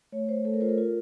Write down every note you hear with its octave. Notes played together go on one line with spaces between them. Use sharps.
A3 C#5
A3 C5
A3 A4
A#4
F4 C5
A#4
F4